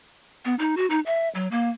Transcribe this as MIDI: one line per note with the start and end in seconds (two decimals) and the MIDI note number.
0.45 0.55 59
0.59 0.75 63
0.77 0.86 66
0.90 1.00 63
1.06 1.28 76
1.35 1.48 54
1.51 1.69 58